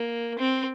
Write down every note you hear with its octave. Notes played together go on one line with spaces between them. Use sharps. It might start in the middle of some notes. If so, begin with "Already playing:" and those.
Already playing: A#3
C4